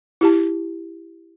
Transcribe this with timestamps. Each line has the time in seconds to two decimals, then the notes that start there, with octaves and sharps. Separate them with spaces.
0.21 E4 G4 A5